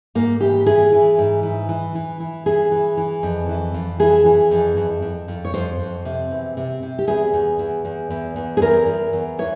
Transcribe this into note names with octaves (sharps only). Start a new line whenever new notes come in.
G#2 A#3
E3 G4
E3 G#4
E3
G#2
E3
E3
E3
E3
E3 G#4
E3
E3
F2
E3
F2
E3 G#4
E3
F2
F2
F2
F2
C#5
F2 C5
F2
C3
E2
C3
C3
G4
E2 G#4
E2
E2
E2
E2
E2
G#4
E2 A#4
E2
E2
E3 C#5